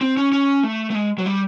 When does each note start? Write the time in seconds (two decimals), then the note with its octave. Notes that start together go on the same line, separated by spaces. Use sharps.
0.01 C4
0.17 C#4
0.32 C#4
0.63 A3
0.90 A3
0.95 G#3
1.18 F#3
1.26 G3